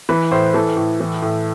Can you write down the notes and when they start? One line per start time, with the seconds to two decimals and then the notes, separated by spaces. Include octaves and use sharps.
0.09 E3 B4
0.31 A2 C5
0.54 E3 A4
0.77 A2
1.00 E3
1.22 A2